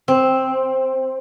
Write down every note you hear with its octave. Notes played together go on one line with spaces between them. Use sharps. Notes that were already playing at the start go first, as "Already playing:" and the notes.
C4